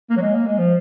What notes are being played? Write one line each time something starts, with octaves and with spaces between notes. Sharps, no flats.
A#3
F#3
G#3
A#3
G#3
F3